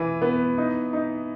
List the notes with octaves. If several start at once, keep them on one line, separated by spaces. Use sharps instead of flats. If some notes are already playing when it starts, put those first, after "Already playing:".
Already playing: E3
B3
D#4
D#4